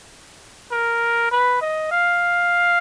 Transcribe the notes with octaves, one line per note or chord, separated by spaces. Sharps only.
A#4
B4
D#5
F5